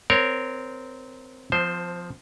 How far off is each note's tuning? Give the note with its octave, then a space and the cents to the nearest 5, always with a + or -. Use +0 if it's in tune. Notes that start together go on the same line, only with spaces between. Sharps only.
C4 -15 A#4 +0 C#5 +0
F3 +5 C4 -35 C5 +0